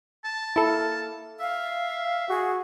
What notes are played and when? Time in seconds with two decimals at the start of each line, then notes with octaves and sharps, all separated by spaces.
0.24 A5
0.56 A#3 E4 A4
1.40 E5 F5
2.30 F#4 G#4